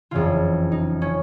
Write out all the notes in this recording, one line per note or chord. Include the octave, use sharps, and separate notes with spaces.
F#1 F2 C#3 E3 F4
D#4
C#4